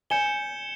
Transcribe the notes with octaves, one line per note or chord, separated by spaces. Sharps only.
G#5 G6 C#7 E7 G7